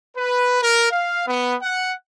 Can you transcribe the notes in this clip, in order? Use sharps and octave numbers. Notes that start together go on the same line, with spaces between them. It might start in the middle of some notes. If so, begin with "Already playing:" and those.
B4
A#4
F5
B3
F#5